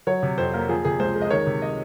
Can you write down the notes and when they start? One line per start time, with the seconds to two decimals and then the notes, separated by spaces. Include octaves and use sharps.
0.07 F#3 C#5
0.23 C3
0.38 F2 C5
0.53 A#3 A#4
0.69 F3 G#4
0.84 C3 G#4
1.00 C#2 C5
1.15 G#3
1.21 D#5
1.30 D#3 C#5
1.47 C3
1.62 D#5